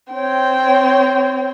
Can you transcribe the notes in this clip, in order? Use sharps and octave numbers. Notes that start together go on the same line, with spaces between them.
C4 C#5 G5